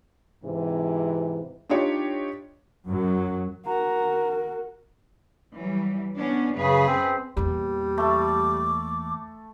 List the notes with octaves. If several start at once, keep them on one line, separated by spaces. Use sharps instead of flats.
G#2 C3 E3
D4 D#4 F4 G4 C#5
F#2 F#3
F#4 A#4 A#5
E3 F#3 G3
B3 C#4 D4
F#2 C#3 G#4 B4
C4
E2 A#2 G3
A3 A4 D6